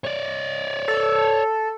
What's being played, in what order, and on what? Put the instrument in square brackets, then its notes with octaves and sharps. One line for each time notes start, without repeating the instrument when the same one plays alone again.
[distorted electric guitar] C#5 D5
[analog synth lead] A4